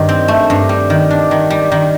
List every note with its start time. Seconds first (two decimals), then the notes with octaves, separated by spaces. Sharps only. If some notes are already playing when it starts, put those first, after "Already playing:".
Already playing: G2 D#3
0.09 C4
0.28 A3
0.50 G2
0.69 G3
0.90 D#3
1.10 D4
1.31 D#3
1.50 G3
1.72 D#3